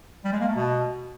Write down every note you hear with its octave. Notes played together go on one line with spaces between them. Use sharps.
G3
G#3
A#3
A3
B2